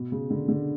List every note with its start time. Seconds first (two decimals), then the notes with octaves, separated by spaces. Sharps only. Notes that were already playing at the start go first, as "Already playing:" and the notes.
Already playing: B2
0.12 C#3
0.30 D3
0.48 D3